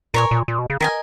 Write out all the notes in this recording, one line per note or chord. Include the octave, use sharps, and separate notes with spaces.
A#2 A#4 C#5 G#5
A#2
A#2
B2
C#3
D#3 A#4 D#5 G#5